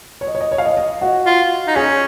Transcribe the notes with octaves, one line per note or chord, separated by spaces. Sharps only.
C#5
D#5
C#5
D#5
C#5
F5
D#5
D#5
F#4
F4
D#4
C#4 G#4